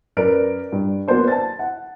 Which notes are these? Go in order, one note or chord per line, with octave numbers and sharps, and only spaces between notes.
F#2 A#4 B4 D5 D7
G2
F#3 A#3 B3 C5 D5
A5 A6
F#5